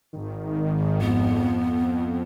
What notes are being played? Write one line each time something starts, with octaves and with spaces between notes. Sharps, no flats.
G#1 D#3
F2 B3